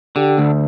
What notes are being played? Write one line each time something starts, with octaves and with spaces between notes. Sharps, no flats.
D3 G4
D2